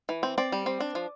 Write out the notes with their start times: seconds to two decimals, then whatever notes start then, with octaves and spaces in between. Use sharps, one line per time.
0.09 E3
0.23 C4
0.38 C4 D5
0.52 G3
0.66 C4
0.80 D4
0.95 F3